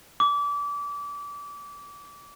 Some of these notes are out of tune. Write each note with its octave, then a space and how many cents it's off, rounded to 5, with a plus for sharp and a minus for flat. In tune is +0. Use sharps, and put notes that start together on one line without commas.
D6 -30